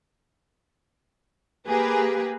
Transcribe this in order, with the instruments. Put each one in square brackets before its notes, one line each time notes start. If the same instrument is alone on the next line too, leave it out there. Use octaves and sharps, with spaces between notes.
[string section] A#3 G4 G#4 B4